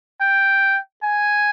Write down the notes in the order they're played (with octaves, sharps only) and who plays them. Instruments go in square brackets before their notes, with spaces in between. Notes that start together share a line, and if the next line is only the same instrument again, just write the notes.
[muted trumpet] G5
G#5